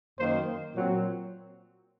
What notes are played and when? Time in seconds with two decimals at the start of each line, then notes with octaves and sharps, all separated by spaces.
0.19 F#2 D#3 A#3 C5
0.75 A#2 F#3 C4